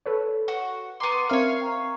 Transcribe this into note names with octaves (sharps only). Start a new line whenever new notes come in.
A4 B4 C#5
F#4
B3 G5 A#5 C6 D6
C4 A#4 C#5 E5 F5 C#7
G5 A#5 C#6